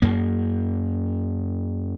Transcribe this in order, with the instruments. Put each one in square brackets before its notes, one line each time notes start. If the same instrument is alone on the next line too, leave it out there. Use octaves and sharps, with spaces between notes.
[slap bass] F#2 A#3